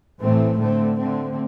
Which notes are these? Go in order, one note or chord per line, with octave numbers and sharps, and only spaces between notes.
A2 E3 A3 C4
D3 A3 C4
D3 A3 C4